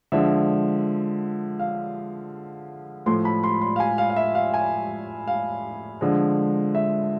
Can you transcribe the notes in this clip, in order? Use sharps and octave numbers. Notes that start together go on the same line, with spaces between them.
D3 F3 G#3 E5
F5
A2 F3 A3 C6
B5
C6
C6
F5
G#5
F5
F5
E5
F5
G#5
F5
D3 F3 G#3
E5